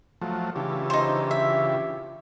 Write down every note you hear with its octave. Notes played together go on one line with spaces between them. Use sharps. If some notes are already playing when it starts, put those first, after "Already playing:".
F3 F#3 A3
C#3 E3 D4 F4 G4
D#4 C5
E5